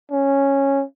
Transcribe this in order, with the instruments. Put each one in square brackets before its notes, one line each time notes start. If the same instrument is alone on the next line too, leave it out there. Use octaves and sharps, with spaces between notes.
[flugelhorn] C#4